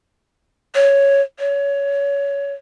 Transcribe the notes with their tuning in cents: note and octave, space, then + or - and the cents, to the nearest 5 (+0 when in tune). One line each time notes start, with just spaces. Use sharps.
C#5 +0
C#5 +20